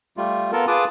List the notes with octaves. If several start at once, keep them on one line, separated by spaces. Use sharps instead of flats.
G3 A3 F4
B3 F4 A4 A#4
F4 G#4 B4 A5 D6 D#6